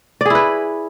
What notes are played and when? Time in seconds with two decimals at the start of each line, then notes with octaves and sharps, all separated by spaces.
0.21 D5
0.26 G#4
0.30 E4
0.35 B4